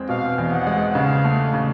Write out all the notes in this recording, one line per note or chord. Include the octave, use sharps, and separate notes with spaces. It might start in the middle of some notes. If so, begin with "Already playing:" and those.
Already playing: E2 G#3 C4
B2 F5
E2
F#5
G#3
C#3 F5
A3
C#3